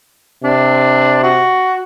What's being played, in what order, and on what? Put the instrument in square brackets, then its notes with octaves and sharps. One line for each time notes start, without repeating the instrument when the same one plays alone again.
[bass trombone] C3 [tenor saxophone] D4
[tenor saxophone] F#4